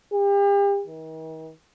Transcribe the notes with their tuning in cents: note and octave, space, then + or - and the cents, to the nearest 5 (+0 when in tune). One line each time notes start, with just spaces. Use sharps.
G4 +40
D#3 +40